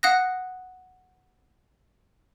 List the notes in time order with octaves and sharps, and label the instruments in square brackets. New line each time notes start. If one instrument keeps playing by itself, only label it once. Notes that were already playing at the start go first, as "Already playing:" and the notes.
[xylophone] F5 F#5 D#6 F#6 A#6